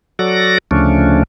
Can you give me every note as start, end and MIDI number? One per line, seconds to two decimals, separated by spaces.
0.19 0.58 54
0.19 0.58 66
0.19 0.58 69
0.19 0.58 74
0.19 0.58 94
0.71 1.23 38
0.71 1.23 49
0.71 1.23 53
0.71 1.23 57
0.71 1.23 61
0.71 1.23 62